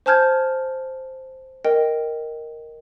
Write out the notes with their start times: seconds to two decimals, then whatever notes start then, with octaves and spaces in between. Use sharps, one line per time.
0.06 C5 G#5 A5 F6 G6 G#6
1.65 A#4 D#5 G5